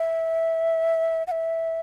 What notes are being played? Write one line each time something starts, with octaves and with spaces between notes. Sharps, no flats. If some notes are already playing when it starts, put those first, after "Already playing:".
Already playing: E5
F#5
E5